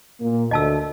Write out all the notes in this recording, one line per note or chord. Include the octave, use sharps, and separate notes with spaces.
A#2 A#3
D2 D#5 A5 E6